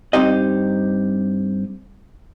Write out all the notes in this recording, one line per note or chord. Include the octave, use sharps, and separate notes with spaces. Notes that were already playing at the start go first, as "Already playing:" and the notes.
G2 C4 D#4 G4 D#5